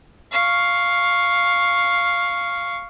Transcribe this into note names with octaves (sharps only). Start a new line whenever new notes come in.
F5 C#6